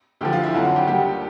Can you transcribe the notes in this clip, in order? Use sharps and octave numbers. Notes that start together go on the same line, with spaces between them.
D2 D3 F3 G4
F4
E4
F#4
F2 D3 F#3 F4
F#4
G4
D#2 D3 G3 G4